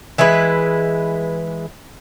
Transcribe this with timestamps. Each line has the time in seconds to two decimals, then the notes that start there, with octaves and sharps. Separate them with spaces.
0.18 E3 G#3 E4 B4